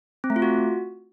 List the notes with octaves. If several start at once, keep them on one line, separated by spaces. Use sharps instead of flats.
C4
A3
F4
F#4